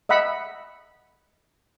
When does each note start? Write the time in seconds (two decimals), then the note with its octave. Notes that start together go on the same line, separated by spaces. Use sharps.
0.09 D#5 E5 F#5 B5